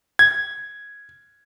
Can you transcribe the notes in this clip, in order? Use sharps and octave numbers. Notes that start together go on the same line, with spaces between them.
G#6